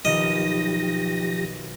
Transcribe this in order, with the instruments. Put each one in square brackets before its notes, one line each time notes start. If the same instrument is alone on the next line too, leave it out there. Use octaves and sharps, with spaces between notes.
[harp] B1 D#3 D#4 [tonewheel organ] F3 G4 A#6 [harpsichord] D#5